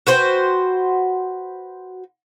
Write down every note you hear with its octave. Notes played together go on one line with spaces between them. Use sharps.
F#4 B4 C5 G5